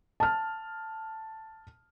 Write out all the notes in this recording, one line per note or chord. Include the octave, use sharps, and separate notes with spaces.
A5 F6